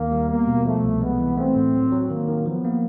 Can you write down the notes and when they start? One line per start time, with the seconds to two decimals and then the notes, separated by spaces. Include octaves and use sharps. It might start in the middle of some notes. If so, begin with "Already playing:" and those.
Already playing: D#2 D#3 A#3
0.12 G3
0.29 A#3 B3
0.47 B2
0.65 F3 A3
0.84 C2
1.02 G#3 B3
1.20 E3
1.37 A3 C4
1.56 A2
1.74 F#3
1.92 F#3
2.10 D#3 A#3
2.28 D#3
2.46 F3 B3
2.65 A#3